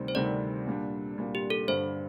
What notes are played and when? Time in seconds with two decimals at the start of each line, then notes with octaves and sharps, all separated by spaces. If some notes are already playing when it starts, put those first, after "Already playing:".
Already playing: D2 C3 D#3 G3 C4
0.08 C5
0.15 D2 C3 D#3 G3 C4 D5
0.66 A#2 G3 D4
1.17 A#2 G3 D4
1.35 G4
1.50 A4
1.68 G2 D3 G3 C5